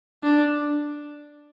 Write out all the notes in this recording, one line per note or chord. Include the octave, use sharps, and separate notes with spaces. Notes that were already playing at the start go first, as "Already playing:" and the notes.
D4